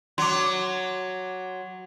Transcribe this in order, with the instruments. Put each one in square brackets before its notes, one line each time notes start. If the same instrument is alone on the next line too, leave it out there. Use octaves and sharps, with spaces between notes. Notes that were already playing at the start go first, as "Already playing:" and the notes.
[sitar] F#3 [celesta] C6 D6